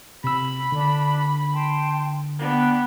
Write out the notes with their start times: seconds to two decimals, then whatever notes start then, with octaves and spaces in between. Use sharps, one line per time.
0.24 C3 B5 E6
0.72 D3 D4
1.54 G5 A5 C6
2.39 B3 D4 G5